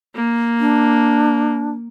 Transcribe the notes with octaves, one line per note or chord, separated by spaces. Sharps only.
A#3
D4